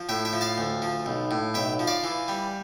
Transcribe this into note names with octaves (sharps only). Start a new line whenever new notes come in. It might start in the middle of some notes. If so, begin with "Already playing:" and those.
Already playing: F3
A2 E5 G5
E5 G5
F3
F5 A5
D2
F3
B1
A2
B1 E5 G5
F3
D5 F5
E3
G3